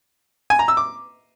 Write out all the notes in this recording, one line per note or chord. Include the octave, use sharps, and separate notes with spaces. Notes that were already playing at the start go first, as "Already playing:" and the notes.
G#5
A#5
E6
D6